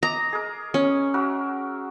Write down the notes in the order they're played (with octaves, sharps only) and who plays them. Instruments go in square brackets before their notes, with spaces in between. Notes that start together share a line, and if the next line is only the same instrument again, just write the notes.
[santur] D#5 D6 [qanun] A#5
[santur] G#4 A#4
[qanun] C#4
[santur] F#4 A#4 E5